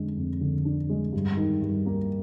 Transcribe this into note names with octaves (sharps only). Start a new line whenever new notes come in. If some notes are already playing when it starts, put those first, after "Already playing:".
Already playing: F2 D3 G#3 D4
F2
D3
D4
G#3
G2
D#3
G2
A#3